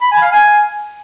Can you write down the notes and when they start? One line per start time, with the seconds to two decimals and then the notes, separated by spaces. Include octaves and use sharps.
0.01 B5
0.11 G#5
0.21 F5
0.32 G#5